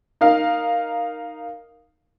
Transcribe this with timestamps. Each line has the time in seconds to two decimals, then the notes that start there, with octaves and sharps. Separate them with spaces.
0.21 D#4 A#4 F5